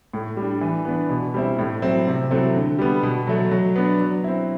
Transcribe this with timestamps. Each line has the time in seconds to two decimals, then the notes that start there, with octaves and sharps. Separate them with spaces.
0.13 A2
0.37 G3
0.42 D4
0.61 E3
0.85 B3 D4
1.10 B2
1.34 G3 C4 E4
1.58 A2
1.82 F#3 C4 E4
2.07 C3
2.31 F#3 A3 C4 E4
2.55 D3
2.79 G3 B3
3.03 B2
3.27 F#3 A3
3.51 F#3
3.76 B3 D4
4.00 F#3
4.24 C4 E4